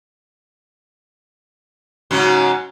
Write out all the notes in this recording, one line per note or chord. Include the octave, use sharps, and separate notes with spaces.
G#2 C#3 F#3